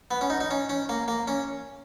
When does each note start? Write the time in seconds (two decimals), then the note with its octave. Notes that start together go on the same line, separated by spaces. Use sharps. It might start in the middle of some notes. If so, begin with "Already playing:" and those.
0.11 B3
0.21 C#4
0.30 D#4
0.40 D#4
0.51 C#4
0.69 C#4
0.89 A#3
1.08 A#3
1.28 C#4